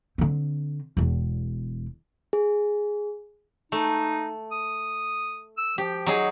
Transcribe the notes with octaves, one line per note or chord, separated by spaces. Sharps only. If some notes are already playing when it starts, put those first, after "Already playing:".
D3 C4
E1 E2
G#4
A3 D#4
D#6
E6
F3 G4
F#3 D#4 G#4